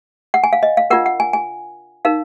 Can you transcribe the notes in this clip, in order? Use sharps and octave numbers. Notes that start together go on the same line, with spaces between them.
F#5
G#5
F5
D#5
F5
D4 F4 A#4 F#5
F#5
G#5
G#5
D#4 A#4 F5